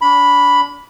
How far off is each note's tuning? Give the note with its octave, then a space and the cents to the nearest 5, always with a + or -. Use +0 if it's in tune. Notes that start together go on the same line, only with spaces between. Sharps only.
D4 -35 B5 +0